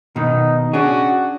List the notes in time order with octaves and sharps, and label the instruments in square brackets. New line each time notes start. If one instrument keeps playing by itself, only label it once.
[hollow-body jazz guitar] B2 D#3 [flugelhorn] D#4
[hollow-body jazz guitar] C#4 D4 G#4 [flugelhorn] F#4